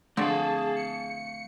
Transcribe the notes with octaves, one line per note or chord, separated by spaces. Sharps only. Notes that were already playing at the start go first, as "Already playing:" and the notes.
D3 F3 A3 C4 G#4 F5 A5
C#7